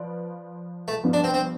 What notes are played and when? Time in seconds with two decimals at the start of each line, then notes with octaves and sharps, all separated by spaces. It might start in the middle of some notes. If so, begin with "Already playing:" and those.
Already playing: F3 F4 B4 D5
0.88 A3
1.04 G2 F3 B3
1.13 D4
1.24 C4
1.34 C4